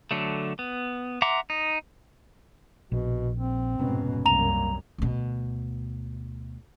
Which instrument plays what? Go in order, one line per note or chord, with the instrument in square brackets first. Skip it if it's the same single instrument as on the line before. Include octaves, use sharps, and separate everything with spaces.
[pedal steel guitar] D3 F#3 A3
B3
E5 F#5 A#5 C6 D6
D#4
[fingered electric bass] A#1 [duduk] B2
[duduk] C4
[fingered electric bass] F1 B3 C#4 [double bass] G#2 B2
[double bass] C2 F#2 [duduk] A#3 [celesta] A#5 F7
[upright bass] D2 B2